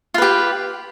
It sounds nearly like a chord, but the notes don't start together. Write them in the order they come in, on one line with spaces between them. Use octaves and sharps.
F4 B4 G4